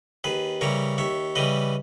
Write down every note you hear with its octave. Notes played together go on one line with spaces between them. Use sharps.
D#2 G#4 B4
C#3 E3 G3 A#4 C#5
D#2 C#5 E5
C#3 E3 G3 B4 D#5